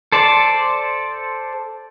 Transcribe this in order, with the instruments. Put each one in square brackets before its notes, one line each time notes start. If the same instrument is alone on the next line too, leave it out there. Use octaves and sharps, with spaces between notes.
[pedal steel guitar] A4 C5 D5 A5